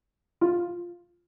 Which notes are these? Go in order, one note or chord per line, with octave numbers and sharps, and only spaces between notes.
F4